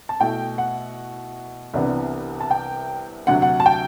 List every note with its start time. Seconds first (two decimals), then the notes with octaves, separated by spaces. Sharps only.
0.09 A5
0.20 B2 A3 E4 G5
0.58 F#5
1.74 C2 C3 E3 B3 D4
2.40 A5
2.51 G5
3.27 D2 C3 F#3 F#5
3.42 F#5
3.60 A5
3.66 G5